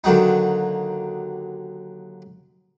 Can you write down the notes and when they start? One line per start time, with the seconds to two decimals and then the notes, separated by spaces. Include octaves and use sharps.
0.04 D#2 D3 F#3 D#4